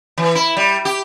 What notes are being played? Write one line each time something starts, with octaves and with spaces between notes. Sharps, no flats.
E3
E4
G3
G4